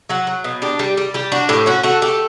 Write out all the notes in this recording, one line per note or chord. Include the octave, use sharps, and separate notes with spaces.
F#3 F#5
F#3
B2
D4 G4
G3
G3
G3 G4
D4 F#4
A2 G4
C#4 F#4
A3 F#4
A3 G4